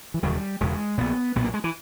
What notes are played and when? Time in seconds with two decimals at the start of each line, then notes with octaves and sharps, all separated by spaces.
0.14 E3
0.22 E1 D#2 C#3 G3
0.60 E1 E2 C#3 G#3
0.98 A#1 A#2 B3
1.35 B1 A#2 B3
1.44 A#3
1.54 G#3
1.64 E3